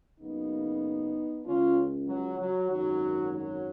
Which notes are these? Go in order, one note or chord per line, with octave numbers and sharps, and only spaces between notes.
F#1 F#2 C#3 B3 D#4
C#2 C#3 C#4 F4
F#3
F#3
G#1 F#2 D#3 F#3
F#3